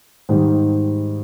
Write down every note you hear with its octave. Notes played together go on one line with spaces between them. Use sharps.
G#2 D#3 G3